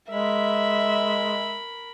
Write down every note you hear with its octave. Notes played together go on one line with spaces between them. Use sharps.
G#3 A#4 E5 B5